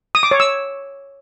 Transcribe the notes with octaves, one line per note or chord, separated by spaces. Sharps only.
D#6
D6
C#5
E6